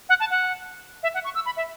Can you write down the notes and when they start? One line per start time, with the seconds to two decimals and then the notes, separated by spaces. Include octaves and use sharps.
0.09 F#5
0.20 A5
0.31 F#5
1.03 E5
1.14 F#5
1.24 C#6
1.35 E6
1.46 B5
1.57 E5